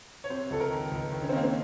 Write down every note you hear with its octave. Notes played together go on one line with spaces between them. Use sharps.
C#5
C3 C5
C#2 A4
A#4
D#3
C#2
D#3
C#4
C4
D#3 A#3
C4